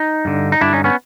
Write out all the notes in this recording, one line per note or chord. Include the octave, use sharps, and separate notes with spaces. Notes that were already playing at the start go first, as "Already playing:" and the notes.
Already playing: D#4
G2 D3
D#4
G2 D3 D4 E4
C#4 D#4
B3 C#4